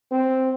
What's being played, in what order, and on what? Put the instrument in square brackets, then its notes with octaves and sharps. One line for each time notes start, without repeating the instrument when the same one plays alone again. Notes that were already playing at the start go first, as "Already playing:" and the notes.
[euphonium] C4